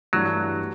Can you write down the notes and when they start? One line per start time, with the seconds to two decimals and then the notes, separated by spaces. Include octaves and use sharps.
0.13 G2 E3 F#3 A3 D4 F#4
0.59 A3